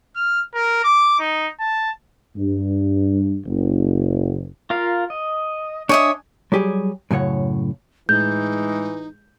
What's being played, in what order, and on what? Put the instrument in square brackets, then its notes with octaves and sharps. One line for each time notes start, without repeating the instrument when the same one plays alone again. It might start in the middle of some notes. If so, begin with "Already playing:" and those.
[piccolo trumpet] F6
A#4
D6
D#4
A5
[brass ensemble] G2
F#1
[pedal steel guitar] F4 A#4 F5
D#5
[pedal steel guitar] D4 G#5 D#6 [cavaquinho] C#5 D#5 E5
[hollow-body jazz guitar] F#3 G3 G4 G#4 C#5
F#2 A2 C#3 C#5 F#5
[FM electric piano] A2 G#3 [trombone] E3 [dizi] D#4 [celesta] G6